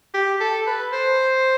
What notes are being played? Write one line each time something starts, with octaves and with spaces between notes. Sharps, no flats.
G4
A4
B4
C5